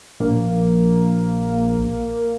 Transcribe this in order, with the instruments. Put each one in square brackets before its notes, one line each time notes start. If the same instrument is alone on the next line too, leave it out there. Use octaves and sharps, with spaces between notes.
[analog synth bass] A#1 [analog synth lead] A#3